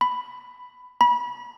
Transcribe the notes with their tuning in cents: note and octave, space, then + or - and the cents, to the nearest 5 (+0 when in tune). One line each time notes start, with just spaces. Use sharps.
B5 +10
B5 -30